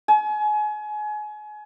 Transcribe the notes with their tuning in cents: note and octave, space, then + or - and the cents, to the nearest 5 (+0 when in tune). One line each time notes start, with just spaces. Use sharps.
G#5 +30